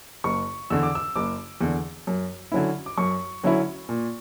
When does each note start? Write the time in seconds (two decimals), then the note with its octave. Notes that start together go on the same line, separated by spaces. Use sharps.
0.24 F#1 C#6
0.70 E2 D3 E6
0.83 D6
0.95 E6
1.16 F#1 D6
1.61 E2 D3
2.07 F#2
2.52 D3 F#3 C#4 E4
2.86 D6
2.98 F#2 C#6
3.43 D3 F#3 C#4 E4
3.89 A#2